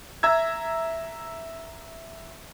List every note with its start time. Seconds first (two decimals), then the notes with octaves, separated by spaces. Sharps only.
0.23 E5 A#5 E6 G#6